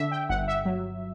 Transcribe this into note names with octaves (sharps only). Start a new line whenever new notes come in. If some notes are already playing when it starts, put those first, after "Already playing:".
Already playing: D3 E5
G5
G1 F#5
E5
F#3